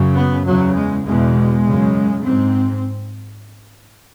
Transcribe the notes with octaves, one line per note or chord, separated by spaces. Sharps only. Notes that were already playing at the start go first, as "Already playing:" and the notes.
Already playing: F#2 C#3
B3
E2 C#3 F#3
G#3
E2 B2 G#3
F#2 C#3
G#2 C4